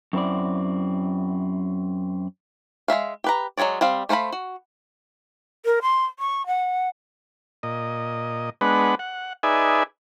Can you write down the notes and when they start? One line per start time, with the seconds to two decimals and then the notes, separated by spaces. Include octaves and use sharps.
0.13 F#2 C4 E4 D5
2.88 G#3 D#4 E5 F5
3.24 G4 B4 A#5
3.57 F#3 G#3 G#4 C#5 D5
3.81 G3 C4 F5
4.09 A3 C5 F5 A#5 B5
4.32 F#4
5.65 A#4
5.82 C6
6.19 C#6
6.47 F#5
7.63 A#2 D#5
8.61 G#3 B3 D4 B4 F#5
8.99 F#5
9.43 D#4 G#4 B4 D5 E5 G#5